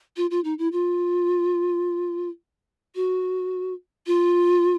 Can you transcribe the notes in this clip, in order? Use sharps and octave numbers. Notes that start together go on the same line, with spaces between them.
F4
F4
D#4
E4
F4
F#4
F4